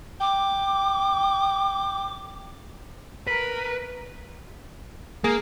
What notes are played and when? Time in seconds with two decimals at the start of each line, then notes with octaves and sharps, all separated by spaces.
0.21 G5 D6
3.27 A#4 B4
5.24 A#3 G#4